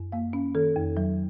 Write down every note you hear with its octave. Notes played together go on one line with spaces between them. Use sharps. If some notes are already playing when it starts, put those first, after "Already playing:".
Already playing: F#2
A#3 F5
C#4
D#3 A4
F2
F#3